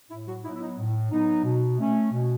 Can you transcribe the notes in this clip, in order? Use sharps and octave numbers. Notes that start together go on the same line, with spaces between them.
A2 E4
F#3 F#4
F#3 B3 D#4 E4
E4
D#4
A2
F#3 B3 D#4
B2
A3 C#4
B2